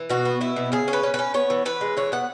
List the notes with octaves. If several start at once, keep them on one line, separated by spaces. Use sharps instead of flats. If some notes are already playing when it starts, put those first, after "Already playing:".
Already playing: E3
B2 F#4
B3
B3 E4
B2
C#3 G#4
C#4
B4
C#4
B4
C#4
B3 C#5
E3
E3 B4
G#3
E3 C#5
B3 F#5